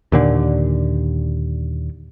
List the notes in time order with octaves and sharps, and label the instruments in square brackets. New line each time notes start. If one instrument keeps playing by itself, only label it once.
[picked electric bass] D#2 A#2 D3